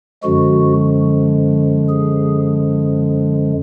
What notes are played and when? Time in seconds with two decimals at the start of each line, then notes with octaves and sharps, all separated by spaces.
0.23 F#2 D3 F3 G#3 F#4
1.89 G#4